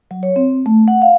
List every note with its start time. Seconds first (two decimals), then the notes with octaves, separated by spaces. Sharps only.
0.11 F#3
0.23 C#5
0.36 C4
0.66 A3
0.88 F#5
1.02 F5